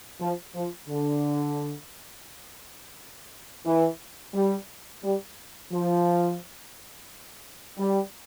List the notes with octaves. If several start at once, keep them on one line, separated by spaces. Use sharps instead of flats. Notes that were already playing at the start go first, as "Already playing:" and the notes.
F3
F3
D3
E3
G3
G3
F3
G3